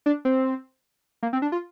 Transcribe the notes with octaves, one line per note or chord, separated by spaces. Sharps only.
D4
C4
A#3
C4
D4
F4